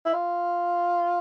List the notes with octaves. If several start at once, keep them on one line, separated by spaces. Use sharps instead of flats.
E4
F4